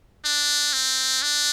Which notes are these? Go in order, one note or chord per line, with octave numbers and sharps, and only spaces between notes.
D4
C4
D4